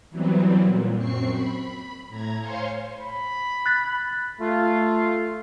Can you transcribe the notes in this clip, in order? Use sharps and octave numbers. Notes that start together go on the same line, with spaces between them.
E3 F#3 G3 B3 C4
A#2
F#2 C4 C#6 C7 C#7
B5
A2 A#5 G#6
C5 C#5 F5 G#5 C6 C#6
B5
F#6 A6 B6
A3 F4